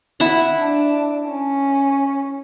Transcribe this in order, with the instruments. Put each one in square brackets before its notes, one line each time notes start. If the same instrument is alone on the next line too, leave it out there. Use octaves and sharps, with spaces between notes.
[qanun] E4 E5 F#5
[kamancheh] D4
C#4